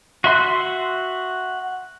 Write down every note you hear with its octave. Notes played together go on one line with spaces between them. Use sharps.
F#4 E5 C6 F#6